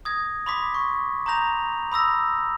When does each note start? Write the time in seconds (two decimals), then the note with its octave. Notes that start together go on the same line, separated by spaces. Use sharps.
0.05 D#6 G#6 A#6
0.46 B5 C6 D6 D#6 B6
0.74 C#6
1.26 A#5 C6 D#6 G6 A#6 F7
1.92 B5 D#6 E6 A#6